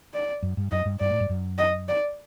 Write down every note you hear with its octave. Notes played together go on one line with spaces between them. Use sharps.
D5
F#2
G2
F#2 D#5
G2
G2 D5
A2
G2
F#2
D#5
D5